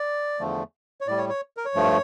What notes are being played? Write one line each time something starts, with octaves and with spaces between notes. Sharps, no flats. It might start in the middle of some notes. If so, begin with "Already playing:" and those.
Already playing: D5
E2 D3 F3 A3
C#5
A2 G3 D5
C#5
C#5
A#4
C#5
G2 F3 A3